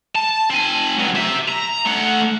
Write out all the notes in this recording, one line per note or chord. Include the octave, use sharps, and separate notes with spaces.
A5
C4 G#5
C#2 F#3
G4 E5
A#5
A3 F#5